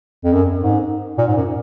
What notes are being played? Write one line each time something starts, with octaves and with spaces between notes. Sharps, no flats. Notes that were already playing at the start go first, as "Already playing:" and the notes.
F2
F#2
G#2
A#2
G#2
F#2